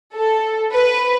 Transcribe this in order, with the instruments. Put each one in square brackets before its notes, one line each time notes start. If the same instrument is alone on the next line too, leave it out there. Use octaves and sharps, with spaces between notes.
[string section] A4
B4